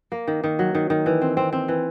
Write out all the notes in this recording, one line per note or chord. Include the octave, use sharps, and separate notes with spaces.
A#3
D#3
D#3
F#3
D#3
D#3
E3
C4
C4
C4
E3